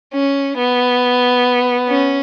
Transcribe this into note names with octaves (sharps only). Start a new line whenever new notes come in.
C#4
B3
C#4